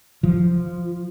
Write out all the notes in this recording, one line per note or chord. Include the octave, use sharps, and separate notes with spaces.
F3